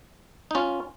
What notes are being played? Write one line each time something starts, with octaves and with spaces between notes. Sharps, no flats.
D#4
C#4 F4